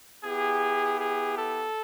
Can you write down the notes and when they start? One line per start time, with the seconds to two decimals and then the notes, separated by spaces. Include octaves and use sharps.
0.24 B3 E4 G4 G#4
0.99 G#4
1.37 A4